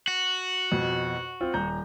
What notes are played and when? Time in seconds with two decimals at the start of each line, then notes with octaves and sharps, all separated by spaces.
0.08 F#4
0.72 F2 B2
1.41 C4 F4
1.54 D#1 A#5 G6